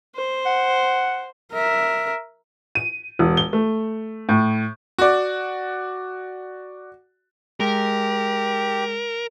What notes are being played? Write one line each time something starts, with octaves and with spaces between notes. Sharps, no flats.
C5
F#5
A#4 E5
D#7
E1
G7
A3
A2
F#4 D5
G#3 G4 A#4